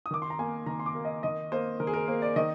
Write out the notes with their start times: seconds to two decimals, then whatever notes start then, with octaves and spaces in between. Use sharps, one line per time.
0.06 D#6
0.11 D#3 D6
0.22 C6
0.30 A#5
0.39 A#3 G#5
0.66 D#3 A#5
0.80 C6
0.86 D6
0.95 A#3
1.05 D#5
1.23 D#3 D#5
1.52 A#3 C5
1.80 D#3 A#4
1.87 G#4
1.93 A#4
2.08 A#3 C5
2.22 D5
2.36 D#3 D#5